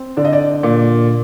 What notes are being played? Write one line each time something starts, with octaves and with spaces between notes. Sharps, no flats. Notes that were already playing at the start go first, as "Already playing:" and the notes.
Already playing: C4
D3 D5
D#5
D5
A#2